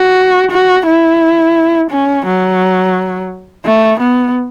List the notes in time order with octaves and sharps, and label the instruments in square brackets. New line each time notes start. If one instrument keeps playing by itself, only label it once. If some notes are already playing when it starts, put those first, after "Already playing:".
Already playing: [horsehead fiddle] F#4
F#4
E4
C#4
F#3
A3
B3